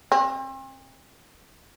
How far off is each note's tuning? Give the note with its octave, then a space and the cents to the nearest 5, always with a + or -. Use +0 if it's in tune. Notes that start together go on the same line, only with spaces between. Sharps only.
C4 +40